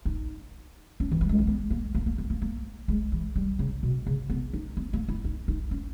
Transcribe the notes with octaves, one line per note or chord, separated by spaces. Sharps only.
D#4
C#4
E3
G3
G#3
A#3
B3
A#3
A#3
A#3
B3
A#3
A#3
G#3
E3
G3
C#3
B2
C#3
B3
D#4
B3
A#3
E4
D#4
D#4
C#4